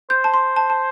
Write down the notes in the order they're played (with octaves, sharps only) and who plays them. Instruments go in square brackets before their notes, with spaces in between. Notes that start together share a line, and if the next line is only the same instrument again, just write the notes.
[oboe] C5 [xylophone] G6
[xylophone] A5
C6
A5
A5